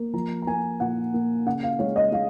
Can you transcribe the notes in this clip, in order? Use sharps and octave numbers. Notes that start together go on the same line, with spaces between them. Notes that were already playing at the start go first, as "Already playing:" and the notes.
Already playing: A#3
F3 A#5
A#5
A#3 G#5
A#2 F#5
A#3
C#3 F#5
F5
G#3 C#5
D#5
G#3 F5